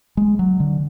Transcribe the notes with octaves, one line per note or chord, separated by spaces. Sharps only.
G#3
F#3
D3